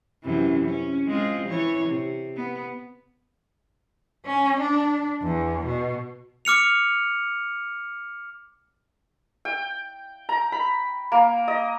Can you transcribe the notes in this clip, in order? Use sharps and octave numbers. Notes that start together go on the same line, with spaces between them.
F#2 C3 E3
C#4
G#3 C4 F4
E3 C#5
C3
B3
C#4
D4
E2
B2
D6 F6 C#7 F7
G5
A#5
B5
A#3
D#5